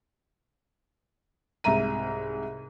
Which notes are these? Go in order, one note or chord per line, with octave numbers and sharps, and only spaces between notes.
C2 G#2 E5 A#5 D#7